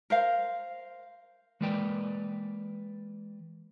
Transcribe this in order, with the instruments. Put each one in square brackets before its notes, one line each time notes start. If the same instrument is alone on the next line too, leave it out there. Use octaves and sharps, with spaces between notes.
[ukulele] A#4 C5 F5
[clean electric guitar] E3 G#3 A#3 B4 D5 G5